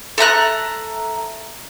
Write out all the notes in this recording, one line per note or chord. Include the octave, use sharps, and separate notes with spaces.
A4 E5 A#5 F#6